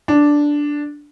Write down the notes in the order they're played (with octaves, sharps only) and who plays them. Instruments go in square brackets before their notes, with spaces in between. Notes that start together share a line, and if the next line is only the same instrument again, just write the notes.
[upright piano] D4